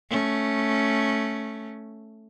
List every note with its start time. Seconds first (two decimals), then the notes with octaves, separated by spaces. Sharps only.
0.10 A3 C#4